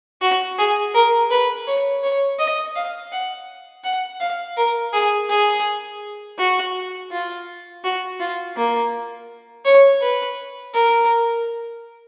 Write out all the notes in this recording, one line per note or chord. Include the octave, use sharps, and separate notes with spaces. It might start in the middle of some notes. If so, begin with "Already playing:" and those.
F#4
G#4
A#4
B4
C#5
C#5
D#5
F5
F#5
F#5
F5
A#4
G#4
G#4
F#4
F4
F#4
F4
A#3
C#5
B4
A#4